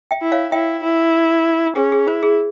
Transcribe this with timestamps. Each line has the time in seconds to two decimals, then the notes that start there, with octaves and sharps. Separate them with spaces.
0.11 E5 G5
0.22 E4
0.32 C#5 F5
0.52 E4 E5 G5
0.83 E4
1.76 C#4 G#4
1.92 G#4
2.07 E4 C5
2.23 G#4